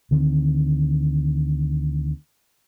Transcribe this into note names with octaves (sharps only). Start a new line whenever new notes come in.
D2 D3 D#3 C4